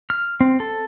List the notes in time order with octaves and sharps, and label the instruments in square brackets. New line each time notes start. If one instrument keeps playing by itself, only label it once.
[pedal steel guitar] F6
C4
A4